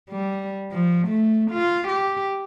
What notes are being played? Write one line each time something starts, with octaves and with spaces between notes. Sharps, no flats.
G3
F3
A3
F4
G4